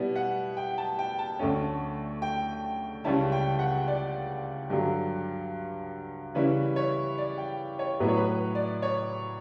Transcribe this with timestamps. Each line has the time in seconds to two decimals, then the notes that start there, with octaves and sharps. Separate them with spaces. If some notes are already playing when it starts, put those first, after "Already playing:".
Already playing: B2 G3 B3 E4
0.16 F#5
0.57 G5
0.78 A5
0.99 G5
1.19 A5
1.39 D2 D3 A3 C#4
2.22 G5
3.04 C#2 C#3 G3 C#4 E4 A5
3.32 G5
3.59 F#5
3.88 D5
4.70 G2 D3 F#3
6.34 C#3 E3 G3 C#4 E4 B4
6.76 C#5
7.18 D5
7.38 G5
7.79 C#5
8.00 A2 F#3 B3 E4 B4
8.08 C#5
8.17 B4
8.28 B4
8.55 D5
8.82 C#5